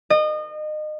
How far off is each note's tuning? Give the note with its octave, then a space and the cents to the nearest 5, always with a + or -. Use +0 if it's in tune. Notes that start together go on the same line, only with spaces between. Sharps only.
D#5 -30